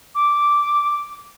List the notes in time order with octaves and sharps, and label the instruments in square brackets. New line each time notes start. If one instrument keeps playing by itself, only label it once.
[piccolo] D6